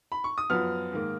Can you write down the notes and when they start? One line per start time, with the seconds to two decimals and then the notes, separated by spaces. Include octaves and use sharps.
0.12 B5
0.24 C#6
0.38 D#6
0.50 F#2 F3 B3 F6
0.92 G#2 D#3 A#3